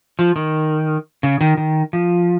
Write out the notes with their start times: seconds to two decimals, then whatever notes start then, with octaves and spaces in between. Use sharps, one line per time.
0.19 F3
0.36 D#3
1.23 C#3
1.41 D#3
1.57 D#3
1.93 F3